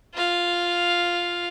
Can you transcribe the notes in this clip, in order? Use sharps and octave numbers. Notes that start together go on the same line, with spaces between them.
F4 F5